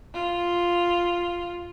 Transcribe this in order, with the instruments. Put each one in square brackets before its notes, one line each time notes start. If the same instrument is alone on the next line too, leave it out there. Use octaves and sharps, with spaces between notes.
[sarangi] F4